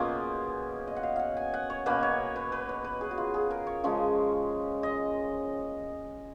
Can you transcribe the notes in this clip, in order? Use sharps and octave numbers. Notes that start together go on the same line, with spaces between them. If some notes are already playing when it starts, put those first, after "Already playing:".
Already playing: B2 A#3 C#4 F4 G#4
D#5
F#5
F5
F5 F#5
G#5
F#5
C#5
B2 A#3 C#4 B4
C#5
B4
B4
C#5
B4
G#4
F#4
F4
G#4
A#4
C#5
C#3 F3 G#3 C#4
D#5